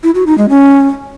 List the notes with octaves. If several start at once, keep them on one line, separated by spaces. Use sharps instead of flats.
E4
F#4
D#4
G#3
C#4